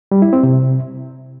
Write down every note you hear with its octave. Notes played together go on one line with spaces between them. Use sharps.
G3
E4
C4
C3